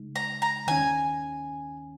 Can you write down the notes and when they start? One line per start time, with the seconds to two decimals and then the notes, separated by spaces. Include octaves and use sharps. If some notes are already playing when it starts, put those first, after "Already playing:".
Already playing: C#3 G#3 D#4
0.16 A#5
0.42 A#5
0.67 D#2 D#3 C#4 G#5